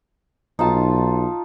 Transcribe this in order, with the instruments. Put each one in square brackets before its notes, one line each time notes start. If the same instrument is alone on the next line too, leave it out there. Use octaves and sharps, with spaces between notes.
[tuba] B1 [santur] D#4 F4 A5